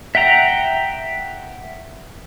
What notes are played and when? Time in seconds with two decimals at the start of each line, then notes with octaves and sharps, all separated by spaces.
0.15 E5 F#5 G5 A#5